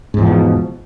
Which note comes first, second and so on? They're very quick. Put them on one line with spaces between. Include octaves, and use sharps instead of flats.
G#2 E2 F3 B2